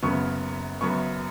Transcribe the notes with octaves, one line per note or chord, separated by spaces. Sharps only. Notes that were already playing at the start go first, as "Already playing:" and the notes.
F#1 F#2 C#3 B3 C#6
F#1 F#2 C#3 B3 C#6